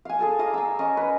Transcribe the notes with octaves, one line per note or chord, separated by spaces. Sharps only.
F5 G#5
G#4 A4 G#5
D5 F5 A#5 D#6
G#5 E6
C#4 D#5
B4